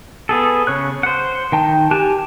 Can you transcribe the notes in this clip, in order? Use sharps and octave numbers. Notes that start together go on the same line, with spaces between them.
B3 G#4 A4
C#3 C#5 F#6
C5 F#5
D#3 G5 A5
G4 G#5 A5 F#6